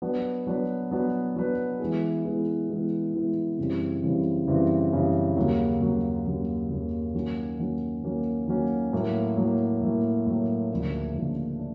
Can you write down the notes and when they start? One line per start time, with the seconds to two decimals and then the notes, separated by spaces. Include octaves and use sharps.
0.02 F#3 B3 D4 F#4 B4
0.47 F#3 B3 D4 F#4 B4
0.91 F#3 B3 D4 F#4 B4
1.36 F#3 B3 D4 F#4 B4
1.80 E3 G#3 B3 E4 G#4
2.25 E3 G#3 B3 E4 G#4
2.69 E3 G#3 B3 E4 G#4
3.14 E3 G#3 B3 E4 G#4
3.58 F#2 C#3 E3 G3 C4
4.03 F#2 C#3 E3 G3 C4
4.47 F#2 C#3 E3 G3 C4
4.92 F#2 C#3 E3 G3 C4
5.36 D#2 C#3 F#3 A#3
5.81 D#2 C#3 F#3 A#3
6.26 D#2 C#3 F#3 A#3
6.69 D#2 C#3 F#3 A#3
7.14 D#3 F#3 A#3 C#4 F#4
7.59 D#3 F#3 A#3 C#4 F#4
8.03 D#3 F#3 A#3 C#4 F#4
8.47 D#3 F#3 A#3 C#4 F#4
8.93 A2 F#3 A#3
9.37 A2 F#3 A#3
9.81 A2 F#3 A#3
10.27 A2 F#3 A#3
10.70 D2 C#3 F3 A#3 D4
11.15 D2 C#3 F3 A#3 D4
11.59 D4